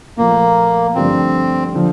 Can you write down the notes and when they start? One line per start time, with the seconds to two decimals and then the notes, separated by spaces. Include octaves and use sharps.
0.17 A#2 F3 A3 A#3
0.95 G2 D3 F3 A3 C4
1.75 D3 F3